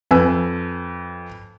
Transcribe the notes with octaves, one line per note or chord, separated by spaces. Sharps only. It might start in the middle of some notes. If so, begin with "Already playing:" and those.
F2 B4 G#5 E6